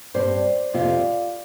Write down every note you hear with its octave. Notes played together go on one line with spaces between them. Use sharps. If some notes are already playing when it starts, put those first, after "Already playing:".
G2 G3 C4 C5
F2 C3 G3 C4 F4